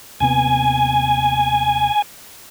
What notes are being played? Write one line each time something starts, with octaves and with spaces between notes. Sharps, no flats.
D#2 C3 B3 G#5